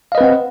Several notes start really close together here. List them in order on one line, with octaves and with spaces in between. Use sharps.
F5 D#5 B4 C4 F#5